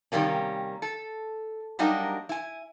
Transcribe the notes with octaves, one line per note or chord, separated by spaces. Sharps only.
C3 D#3 G3 A#3 C#4
A4
F#3 G3 A#3 D4 D#4 D#5
E4 G#5